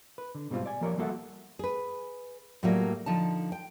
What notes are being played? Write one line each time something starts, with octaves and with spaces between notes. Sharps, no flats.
B4
D3
G#2 B2 G3 C4 F4
D5 G#5
F3 A#3 G4 A#4 C#5 D5
G3 A#3 F#4 A4 E5 F#5
G#4 B4
A2 F#3 G3 A#3 F4
D3 F3 D#4 A5
G5